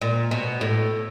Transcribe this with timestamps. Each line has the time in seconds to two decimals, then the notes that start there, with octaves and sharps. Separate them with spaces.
0.01 A#2
0.31 B2
0.61 A2